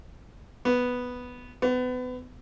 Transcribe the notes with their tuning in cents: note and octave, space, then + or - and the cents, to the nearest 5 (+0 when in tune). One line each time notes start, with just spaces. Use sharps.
B3 +0
B3 +30